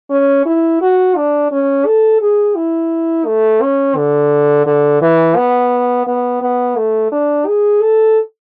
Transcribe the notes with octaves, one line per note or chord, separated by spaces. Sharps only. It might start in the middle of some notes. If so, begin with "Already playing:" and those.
C#4
E4
F#4
D4
C#4
A4
G#4
E4
A3
C#4
D3
D3
E3
B3
B3
B3
A3
D4
G#4
A4